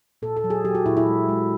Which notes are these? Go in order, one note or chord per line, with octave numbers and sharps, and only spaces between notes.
A#2 A4
A4
F#3
G#4
F#3 G4
F#4
A#2 E4
E4
G#3
G#3